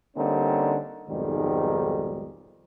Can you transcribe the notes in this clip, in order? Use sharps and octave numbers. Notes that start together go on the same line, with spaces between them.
D3 G3 A#3 C4 C#4 D#4
B1 F2 G#2 D#3 G3 G#3